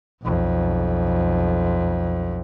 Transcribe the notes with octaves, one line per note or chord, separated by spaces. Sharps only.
B1 F2